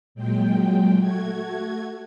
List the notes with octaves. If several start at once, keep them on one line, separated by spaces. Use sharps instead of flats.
A#2 F#3 G#3 G5
A3 F#4 G#6